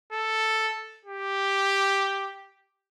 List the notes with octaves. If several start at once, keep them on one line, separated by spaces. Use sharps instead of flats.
A4
G4